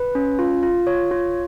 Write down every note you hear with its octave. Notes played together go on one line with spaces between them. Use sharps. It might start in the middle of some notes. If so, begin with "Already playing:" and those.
Already playing: B4
C#4
F4
F4
C#5
F4